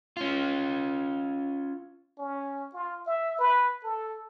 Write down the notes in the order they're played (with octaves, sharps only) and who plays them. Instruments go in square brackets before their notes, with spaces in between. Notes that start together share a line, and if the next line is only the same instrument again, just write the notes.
[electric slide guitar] C#4 F4
[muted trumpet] C#4
F4
E5
B4
A4